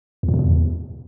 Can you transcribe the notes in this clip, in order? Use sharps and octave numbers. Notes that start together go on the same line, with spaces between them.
E2
A#2
C3
B2
E2